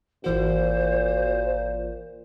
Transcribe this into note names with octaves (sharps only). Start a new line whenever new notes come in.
G#1 A#2 E3 F#4 C5